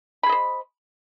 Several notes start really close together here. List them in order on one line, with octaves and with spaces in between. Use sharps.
B5 G#4 D#5 C5